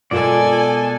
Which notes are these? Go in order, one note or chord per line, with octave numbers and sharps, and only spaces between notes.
B2 G#3 F4 A4 A#4 D5 G#5